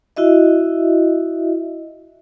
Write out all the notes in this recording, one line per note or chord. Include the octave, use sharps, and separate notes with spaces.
E4 F#4 D#5 E5